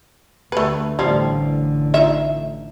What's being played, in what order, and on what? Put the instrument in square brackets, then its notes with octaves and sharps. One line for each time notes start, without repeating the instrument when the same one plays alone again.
[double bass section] D2 [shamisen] A3 B4
[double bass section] A1 D3 [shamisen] F3 G3
[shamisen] D#4 F4 E5